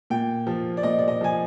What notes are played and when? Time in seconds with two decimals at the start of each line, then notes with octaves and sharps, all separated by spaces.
0.10 A#2 G5
0.47 F3
0.77 D5
0.83 A#2 D#5
0.99 D5
1.08 D#5
1.21 F3 G#5